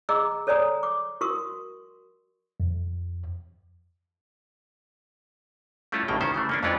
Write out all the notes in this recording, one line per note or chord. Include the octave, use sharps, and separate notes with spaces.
G#4 D#5 A#5 D6 E6
A4 C#5 D5 G#5 A#5 D#6
D6
F#4 A#4 C#6 D#6
F2
G3 A3 C#4 E4 F4
A1 A2 C#3 A#3 G5
D#3 G3 C#4 C5
C#3 E3 A3
A#3 C#4 D4
F2 E3 G#3 C#4 F4 D5